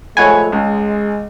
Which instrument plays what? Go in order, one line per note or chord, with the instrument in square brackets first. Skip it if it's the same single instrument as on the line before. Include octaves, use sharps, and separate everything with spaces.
[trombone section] F3 G#3 A3 [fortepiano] C#5 F#5 B5 [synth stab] G#5
[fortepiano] C#2 [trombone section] G#3